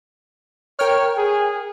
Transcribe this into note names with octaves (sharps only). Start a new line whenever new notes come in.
A#4 C#5 G5 F6
G#4